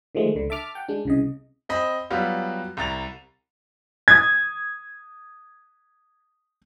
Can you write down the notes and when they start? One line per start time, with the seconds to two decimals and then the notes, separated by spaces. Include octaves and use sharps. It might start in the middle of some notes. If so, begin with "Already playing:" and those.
0.15 D3 D#3 F3 G#3 A3
0.35 C#2 D3
0.50 E5 A5 D6 F6
0.75 F#5 G5
0.88 G#3 D4
1.05 C2 C#3 D#5
1.69 C4 D#5 B5
2.10 F#3 G3 B3 F4 F#4
2.77 C2 A#5 A6 F7
4.08 D#6 G#6